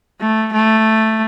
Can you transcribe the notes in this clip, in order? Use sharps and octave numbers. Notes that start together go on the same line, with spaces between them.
A3
A3